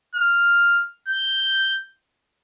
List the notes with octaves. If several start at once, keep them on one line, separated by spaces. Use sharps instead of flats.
F6
G6